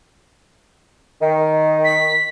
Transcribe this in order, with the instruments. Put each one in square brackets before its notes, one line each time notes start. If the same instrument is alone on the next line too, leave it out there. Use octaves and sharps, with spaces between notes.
[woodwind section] D#3
[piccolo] B6